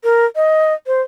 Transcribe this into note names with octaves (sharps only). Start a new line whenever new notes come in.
A#4
D#5
C5